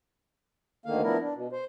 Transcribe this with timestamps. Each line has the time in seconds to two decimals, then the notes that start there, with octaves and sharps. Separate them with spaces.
0.86 D2 D3 D#3 A#3 F5
1.03 F3 B3 D4 E4 A#4
1.21 D4
1.35 B2
1.52 C5